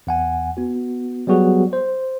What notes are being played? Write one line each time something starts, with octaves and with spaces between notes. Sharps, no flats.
E2 F#5 G#5
B3 F#4
F#3 G3 B3 F#4 G#4
C5